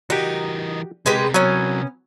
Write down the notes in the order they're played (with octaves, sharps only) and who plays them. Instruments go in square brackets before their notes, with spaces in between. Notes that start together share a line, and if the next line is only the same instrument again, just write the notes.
[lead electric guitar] E3 A#4 [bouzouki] D#4 [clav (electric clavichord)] F#4 G4
[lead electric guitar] C3 A#4 [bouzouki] G#3 G4 B4
[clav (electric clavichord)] F#3 [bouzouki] B3 C#4